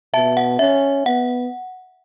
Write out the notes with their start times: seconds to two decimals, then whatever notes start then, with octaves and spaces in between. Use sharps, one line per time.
0.14 B2 E5 A5
0.37 F#5
0.59 C#4 E5
1.06 B3 F#5